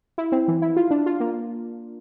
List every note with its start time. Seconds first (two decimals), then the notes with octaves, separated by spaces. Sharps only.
0.18 E4
0.32 C4
0.48 E3
0.62 E4
0.76 F4
0.91 D4
1.06 F4
1.20 A#3